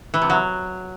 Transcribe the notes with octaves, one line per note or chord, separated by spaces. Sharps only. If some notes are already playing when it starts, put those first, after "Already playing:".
E3
C3
F#3